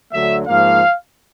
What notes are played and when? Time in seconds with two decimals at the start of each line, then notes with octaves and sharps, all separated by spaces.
0.13 D2 D3 F#3 A3 E5
0.47 G#2 F3 A#3 F5